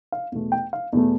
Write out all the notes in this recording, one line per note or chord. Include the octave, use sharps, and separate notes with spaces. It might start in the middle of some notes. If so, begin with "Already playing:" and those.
F5
E2 B2 A3
G5
F5
E2 B2 A3